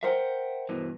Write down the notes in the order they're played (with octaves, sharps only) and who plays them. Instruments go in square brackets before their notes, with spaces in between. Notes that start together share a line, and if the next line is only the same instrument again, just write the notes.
[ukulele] A#4 C5 [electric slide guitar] E5 F#5 G5
[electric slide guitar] G2 B2 E3